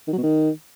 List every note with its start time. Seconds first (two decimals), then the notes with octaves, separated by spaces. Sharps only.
0.07 D#3
0.13 F#3
0.18 B2
0.23 D#3